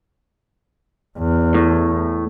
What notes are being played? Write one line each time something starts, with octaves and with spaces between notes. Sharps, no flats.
E2
A2